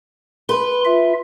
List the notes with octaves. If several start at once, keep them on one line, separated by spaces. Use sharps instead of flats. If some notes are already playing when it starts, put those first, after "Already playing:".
B4 C6
F4 E5